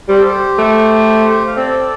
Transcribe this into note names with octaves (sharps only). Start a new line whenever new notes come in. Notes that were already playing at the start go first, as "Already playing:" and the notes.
G3 G4 C5
A4
G4 C5
A3
F5
C4 A4 D5